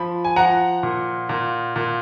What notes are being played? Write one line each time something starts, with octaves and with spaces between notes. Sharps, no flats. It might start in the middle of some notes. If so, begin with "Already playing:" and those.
Already playing: F3 B5
G#5
F3 F#5 A#5
A#2
A#2
A#2